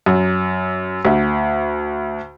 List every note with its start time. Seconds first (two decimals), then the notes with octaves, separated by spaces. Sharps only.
0.06 F#2
1.05 D2